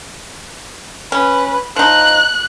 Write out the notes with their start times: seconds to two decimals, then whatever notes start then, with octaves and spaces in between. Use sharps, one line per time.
1.12 C#4 B4
1.76 F3 D#4 F#6